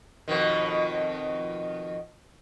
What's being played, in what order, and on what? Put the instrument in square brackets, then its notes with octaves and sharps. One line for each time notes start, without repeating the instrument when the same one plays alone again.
[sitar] F2 B2 D#3